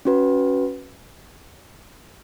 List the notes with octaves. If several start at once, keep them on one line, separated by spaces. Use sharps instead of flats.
C#4 F#4 B4